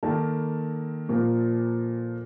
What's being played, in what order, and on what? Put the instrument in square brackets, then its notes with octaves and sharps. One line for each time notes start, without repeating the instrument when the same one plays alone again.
[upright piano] D#3 A#3 A4 A5
A#2 F3 A#3